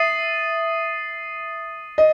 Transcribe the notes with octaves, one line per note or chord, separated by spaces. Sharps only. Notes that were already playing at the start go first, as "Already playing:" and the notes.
Already playing: E5 D#6 A6 C7 D#7
D#5